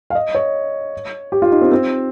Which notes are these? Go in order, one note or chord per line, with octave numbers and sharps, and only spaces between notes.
F5
D#5
C#5
G4
F4
D#4
C4
C4